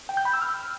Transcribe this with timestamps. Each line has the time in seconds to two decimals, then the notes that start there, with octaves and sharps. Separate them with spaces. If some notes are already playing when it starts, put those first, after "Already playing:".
0.09 G5
0.17 G6
0.25 B5
0.34 E6
0.42 F6